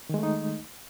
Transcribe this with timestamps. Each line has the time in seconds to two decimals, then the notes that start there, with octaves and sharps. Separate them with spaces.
0.09 D#3
0.14 G#3
0.19 A3
0.23 D#4